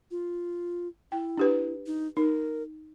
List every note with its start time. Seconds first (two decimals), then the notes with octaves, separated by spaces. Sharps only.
0.11 F4
1.12 E4 G5
1.38 D4 G4 B4
1.86 D#4
2.17 D#4 A#4